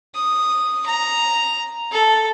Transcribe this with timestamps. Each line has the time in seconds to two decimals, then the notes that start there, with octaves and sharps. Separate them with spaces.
0.15 D#6
0.86 A#5
1.92 A4